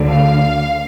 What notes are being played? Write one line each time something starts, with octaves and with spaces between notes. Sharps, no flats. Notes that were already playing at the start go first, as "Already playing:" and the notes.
Already playing: D2 D3
F5